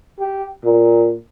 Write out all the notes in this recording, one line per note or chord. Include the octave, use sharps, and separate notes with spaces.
G4
A#2